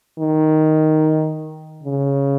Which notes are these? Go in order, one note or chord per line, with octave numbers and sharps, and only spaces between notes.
D#3
C#3